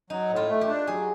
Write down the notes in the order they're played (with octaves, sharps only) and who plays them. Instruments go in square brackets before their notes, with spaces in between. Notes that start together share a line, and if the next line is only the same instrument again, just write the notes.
[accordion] F#3 [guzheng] D#4
[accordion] A2
[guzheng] F4
[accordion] A3
[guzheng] G4
[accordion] D4
[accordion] F#3 [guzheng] G#4